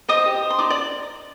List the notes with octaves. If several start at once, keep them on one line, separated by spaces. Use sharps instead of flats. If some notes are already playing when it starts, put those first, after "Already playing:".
C5 D#5 D#6
G4
C5
C6
D#4 D5 D6
D5 D6